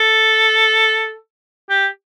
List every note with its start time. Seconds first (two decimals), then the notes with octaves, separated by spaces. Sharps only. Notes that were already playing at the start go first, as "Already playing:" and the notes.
Already playing: A4
1.70 G4